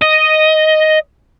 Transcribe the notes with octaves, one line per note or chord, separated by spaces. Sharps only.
D#5